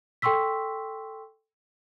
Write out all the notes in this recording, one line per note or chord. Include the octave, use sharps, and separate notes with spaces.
A4 G5 C6 C#6 E6 B6